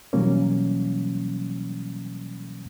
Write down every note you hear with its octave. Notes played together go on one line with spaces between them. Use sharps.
B2 E3 F#3 G3 A#3 C#4